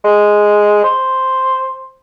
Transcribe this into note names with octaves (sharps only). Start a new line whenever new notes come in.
G#3
C5